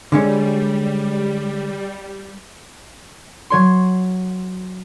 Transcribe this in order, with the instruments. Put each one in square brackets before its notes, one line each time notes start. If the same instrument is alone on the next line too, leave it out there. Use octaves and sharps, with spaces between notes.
[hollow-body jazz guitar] D3 G#3 C#4 [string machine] G3
[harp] F#3 C#5 C6